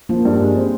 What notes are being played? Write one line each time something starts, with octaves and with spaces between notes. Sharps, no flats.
F3 A#3
G2
G#3
C4